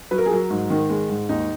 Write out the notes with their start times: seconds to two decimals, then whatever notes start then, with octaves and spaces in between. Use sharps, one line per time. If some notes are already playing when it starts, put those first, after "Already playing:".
0.11 F#3 B4
0.18 A#4
0.26 G#4
0.31 F#3 A#4
0.50 G#2
0.70 D#3
0.90 G#3
1.09 G#2
1.29 D#2 D#4